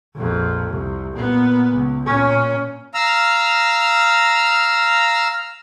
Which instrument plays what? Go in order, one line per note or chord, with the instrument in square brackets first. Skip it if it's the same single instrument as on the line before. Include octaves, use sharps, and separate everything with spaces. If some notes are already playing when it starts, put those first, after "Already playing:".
[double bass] A#1 F2
C2
A#2 B3
C#2
A#2 C#4
[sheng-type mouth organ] F5 A#5 E6 F6